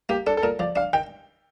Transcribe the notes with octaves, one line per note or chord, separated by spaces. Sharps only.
A#3 G4
D4 A4
A4
A#2 A#4
F3 D5
D4 F5
D#3 G5